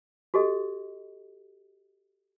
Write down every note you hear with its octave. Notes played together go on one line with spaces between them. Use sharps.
F#4 G4 A4 D#5